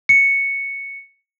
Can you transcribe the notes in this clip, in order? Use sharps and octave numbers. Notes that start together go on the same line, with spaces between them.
C#7